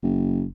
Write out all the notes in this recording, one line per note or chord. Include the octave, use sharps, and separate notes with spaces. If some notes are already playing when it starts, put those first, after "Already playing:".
F#1